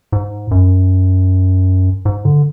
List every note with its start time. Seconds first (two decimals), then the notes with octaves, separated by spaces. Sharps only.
0.12 G#2
0.51 F#2
2.05 G#2
2.25 D3